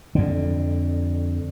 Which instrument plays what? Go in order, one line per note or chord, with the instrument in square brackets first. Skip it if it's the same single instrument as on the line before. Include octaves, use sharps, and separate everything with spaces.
[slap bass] F2 D3